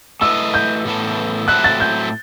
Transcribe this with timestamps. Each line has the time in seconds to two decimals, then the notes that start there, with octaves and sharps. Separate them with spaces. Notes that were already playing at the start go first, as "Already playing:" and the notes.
0.21 A3 E4 B4 D#5 E6
0.54 G6
0.85 A2 E3 B3 E4 A4
1.48 A2 F#3 C4 E4 A4 F#6
1.64 A6
1.80 G6